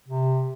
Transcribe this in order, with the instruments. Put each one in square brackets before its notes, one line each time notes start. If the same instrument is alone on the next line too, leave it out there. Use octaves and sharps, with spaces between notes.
[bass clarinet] C3